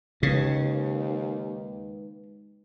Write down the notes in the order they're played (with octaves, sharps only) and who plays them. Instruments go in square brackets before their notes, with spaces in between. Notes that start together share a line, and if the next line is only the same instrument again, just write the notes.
[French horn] D#2 [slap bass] C#3 [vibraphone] G#3 D#4 B4